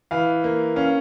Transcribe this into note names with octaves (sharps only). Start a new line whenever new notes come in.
E3 F5
A#3
C#4 F5